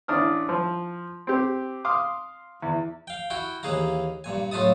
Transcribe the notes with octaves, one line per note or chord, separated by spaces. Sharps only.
A1 D4 D#6 F6
F3
C4 G4
F5 C6 D6 D#6
E2
F5 G5
E4 F#4 G5
D#2 E3 G#4 F5 A#5
G2 A#2 G#5
F#2 A2 F4 E5 A5 D#6